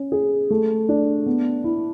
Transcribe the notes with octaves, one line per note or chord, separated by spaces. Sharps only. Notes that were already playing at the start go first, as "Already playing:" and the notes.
Already playing: C#4
G#4
A3
D4
B3
E4